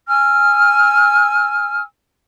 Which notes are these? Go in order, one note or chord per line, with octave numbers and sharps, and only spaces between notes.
G#5 E6 F6